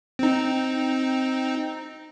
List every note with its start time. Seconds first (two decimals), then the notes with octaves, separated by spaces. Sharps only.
0.19 C4 D#4